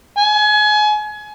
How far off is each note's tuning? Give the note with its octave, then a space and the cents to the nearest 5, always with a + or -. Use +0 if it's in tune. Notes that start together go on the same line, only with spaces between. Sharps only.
G#5 +30